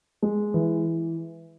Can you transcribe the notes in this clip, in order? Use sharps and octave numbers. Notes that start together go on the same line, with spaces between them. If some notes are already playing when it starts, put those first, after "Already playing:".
G#3
E3